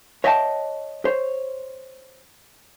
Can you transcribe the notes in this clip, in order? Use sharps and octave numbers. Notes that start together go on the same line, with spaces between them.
C#5 D#5 E5 F#5 G5 A5
C5 C#5